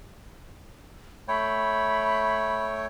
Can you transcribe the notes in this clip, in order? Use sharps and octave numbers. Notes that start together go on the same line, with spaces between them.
A3 C#5 G5 B5